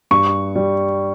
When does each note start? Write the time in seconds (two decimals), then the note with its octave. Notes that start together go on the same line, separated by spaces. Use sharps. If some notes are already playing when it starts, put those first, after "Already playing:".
0.11 G2 C#6
0.56 G3